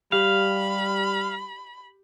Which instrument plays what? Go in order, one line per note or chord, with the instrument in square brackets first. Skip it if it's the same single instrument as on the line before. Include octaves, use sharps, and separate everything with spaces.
[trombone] G3 [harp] G4 [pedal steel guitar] F5 [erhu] B5